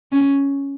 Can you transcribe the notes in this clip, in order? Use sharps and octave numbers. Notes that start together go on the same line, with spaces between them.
C#4